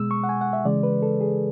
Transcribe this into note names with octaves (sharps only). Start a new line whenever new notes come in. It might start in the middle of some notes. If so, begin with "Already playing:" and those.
Already playing: B2 G#3 E6
C#6
F#5
G#5
F#5
E5
C#3 E3 G#3 D5
B4
A4
G#4